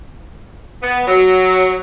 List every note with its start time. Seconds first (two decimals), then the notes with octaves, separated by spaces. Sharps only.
0.82 B3
1.07 F#3